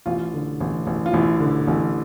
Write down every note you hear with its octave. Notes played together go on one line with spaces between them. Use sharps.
A1 F4
D3
A1
A1
F4
A1 E4
D3
A1